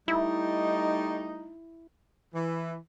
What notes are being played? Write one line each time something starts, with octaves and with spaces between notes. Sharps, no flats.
G3 A3 D#4 E4
E3